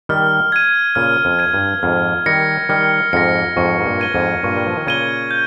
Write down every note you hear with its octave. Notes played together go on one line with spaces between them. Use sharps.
D#3 G3 F6
G#6 D#7
A#2 C#3 F6
F2
G#6 D#7
G2
F2 G#2 F6
D#3 G3 A#6 C#7
D#3 G3 F6
F2 G#2 A#6 C#7
F2 G#2 C#6
G#2
G2 A#2
G#6 D#7 G7
F2 G#2
G2 A#2 C#6
G3
F3
D#3
A#2 C#3 G#6 D#7 G7
G6